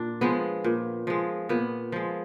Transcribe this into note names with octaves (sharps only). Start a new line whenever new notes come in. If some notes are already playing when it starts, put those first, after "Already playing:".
Already playing: A#2 D4
F3 G#3 B3
A#2
F3 G#3
A#2 B3
F3 G#3